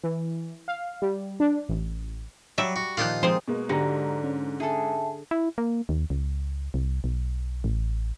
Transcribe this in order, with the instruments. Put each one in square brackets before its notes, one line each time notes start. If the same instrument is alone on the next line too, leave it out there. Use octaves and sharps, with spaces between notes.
[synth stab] E3
F5
G3
D4
A1
[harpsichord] F#3 [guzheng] G3 [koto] E5
[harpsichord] F#4
[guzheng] A#2 D#3 F3 [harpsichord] F4 D#6 [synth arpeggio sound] F#6 G6 A6
[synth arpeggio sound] F3 [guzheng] G#3 C4 D#4 [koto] C5
[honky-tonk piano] B2 G#3 A#3
[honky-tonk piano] G#2 A#6 [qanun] D3 F#3 [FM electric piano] G4 A#5 [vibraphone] A4 D5
[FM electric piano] C#4
[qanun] G#4 A4 [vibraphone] E5 G#5 A5
[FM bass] E4
A#3
D#2
C#2
C2
B1
A1